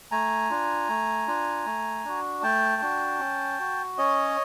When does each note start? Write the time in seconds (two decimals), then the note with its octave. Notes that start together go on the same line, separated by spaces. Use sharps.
0.11 A3 G#5 A#5
0.50 D4 F4
0.89 A3
1.27 D4 F4
1.66 A3
2.05 D4 F#4
2.43 A3 G5 A5
2.82 D4 F#4
3.20 C#4
3.60 F#4
3.98 C#4 C#5 D#5